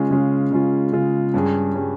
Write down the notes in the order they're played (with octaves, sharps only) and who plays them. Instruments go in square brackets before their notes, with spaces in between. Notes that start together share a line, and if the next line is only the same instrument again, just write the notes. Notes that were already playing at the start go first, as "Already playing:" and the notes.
Already playing: [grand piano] C#3 G#3 C#4 F4
C#3 G#3 C#4 F4
C#3 G#3 C#4 F4
C#3 G#3 C#4 F4
G2 G3 C#4 G#4
G3 C#4 G#4